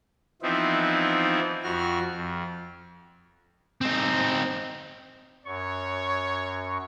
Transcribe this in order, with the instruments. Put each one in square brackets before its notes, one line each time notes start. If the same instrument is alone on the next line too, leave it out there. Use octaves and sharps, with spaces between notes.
[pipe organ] E3 F3 B3 C4 D#4 E4
F2 F#4 F6
F2
[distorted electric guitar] C4 D#4
[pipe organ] F#2 C#6 [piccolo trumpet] C#5